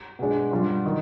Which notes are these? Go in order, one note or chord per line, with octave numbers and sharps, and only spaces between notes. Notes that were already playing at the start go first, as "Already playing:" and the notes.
B2 G#3 D4
B2 G3 D4 F4
D#3